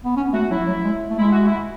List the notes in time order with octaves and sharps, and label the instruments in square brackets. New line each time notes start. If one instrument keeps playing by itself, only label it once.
[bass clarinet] B3
C#4
[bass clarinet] A3 [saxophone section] F#4
[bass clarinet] F#3 [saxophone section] E4
[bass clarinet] F#3
G#3
A3
[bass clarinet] G#3 [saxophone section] E4
[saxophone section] F#4
E4